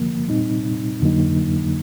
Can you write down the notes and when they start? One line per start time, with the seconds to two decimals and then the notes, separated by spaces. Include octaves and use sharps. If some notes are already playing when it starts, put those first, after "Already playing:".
Already playing: D3 F3 A#3
0.28 A#2 G3 C4 D#4
1.01 F2 D3 F#3 A#3 D#4